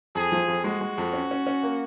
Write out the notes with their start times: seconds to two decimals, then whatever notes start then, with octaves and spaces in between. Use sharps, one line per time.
0.15 F2 G#4
0.32 F3
0.48 F2
0.64 G#3 F#4
0.81 G#3
0.98 F2
1.13 C#4
1.31 C#4
1.47 C#4
1.63 A#3